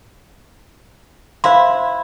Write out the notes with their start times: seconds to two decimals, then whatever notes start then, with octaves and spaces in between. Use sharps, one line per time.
1.44 E4 C5 F5 C6